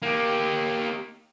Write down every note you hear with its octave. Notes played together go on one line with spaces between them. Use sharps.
A#3 G4